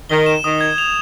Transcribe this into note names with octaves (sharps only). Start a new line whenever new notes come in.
D#3 G7
E7
D#3 D#6
G#6
F7